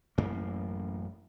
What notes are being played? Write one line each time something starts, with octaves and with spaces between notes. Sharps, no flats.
A1 F#2 A2 A#3